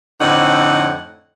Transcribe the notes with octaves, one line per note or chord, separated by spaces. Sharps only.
F2 A2 D3 C4 D#4 F#5